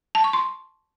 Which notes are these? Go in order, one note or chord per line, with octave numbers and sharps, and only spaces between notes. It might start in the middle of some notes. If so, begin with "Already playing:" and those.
A5
C#6
C6